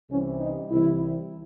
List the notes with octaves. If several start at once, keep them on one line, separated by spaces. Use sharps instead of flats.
C2 C3 E3 C#4
D#4
C2 C3 E3 E4